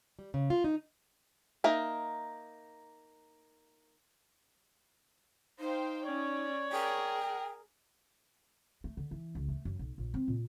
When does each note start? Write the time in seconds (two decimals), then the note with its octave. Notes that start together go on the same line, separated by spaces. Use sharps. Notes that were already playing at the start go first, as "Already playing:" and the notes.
0.19 G3
0.34 C#3
0.50 F4
0.64 D#4
1.64 A#3 D#4 E5
5.59 D#4 C5 F5 G5
6.06 C#4 C#5 D5
6.72 G#4 A#4 G5
8.84 A3
8.97 D3
9.11 E3
9.35 C#2
9.48 A3
9.65 F#2
9.79 B1
9.98 A#1
10.14 C4
10.28 A#2